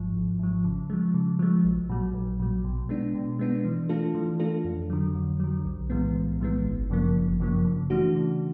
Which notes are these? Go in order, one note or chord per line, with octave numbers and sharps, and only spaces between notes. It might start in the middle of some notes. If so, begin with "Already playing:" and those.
Already playing: G#1 G#2 F3
G#1
G#2 F3
C#3
F3 G#3
C#3
F3 G#3
A#1
A#2 F#3
A#1
A#2 F#3
B2
G#3 B3 D4
B2
G#3 B3 D4
E3
A3 D4 F4 A4
E3
A3 D4 F4 A4
F2
D3 F#3
F2
D3 F#3
B1
A2 E3 G#3 B3
B1
A2 E3 G#3 B3
G1
F#2 C#3 F3 A#3
G1
F#2 C#3 F3 A#3
C#3
E3 A3 D4 F#4
C#3